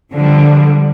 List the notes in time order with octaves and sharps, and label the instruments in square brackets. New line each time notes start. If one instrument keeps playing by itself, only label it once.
[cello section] D3 F3 G3